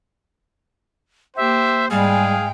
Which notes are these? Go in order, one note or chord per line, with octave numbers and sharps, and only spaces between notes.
A#3 G4 C5 E5
G#2 G3 G#3 G#4 F5 G5